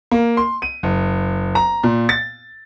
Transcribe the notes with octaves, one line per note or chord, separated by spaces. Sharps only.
A#3
C6
D#7
F#1
A#5
A#2
A6